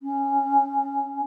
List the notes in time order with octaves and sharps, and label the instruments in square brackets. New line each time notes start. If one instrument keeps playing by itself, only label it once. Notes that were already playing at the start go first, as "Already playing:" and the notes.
[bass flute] C#4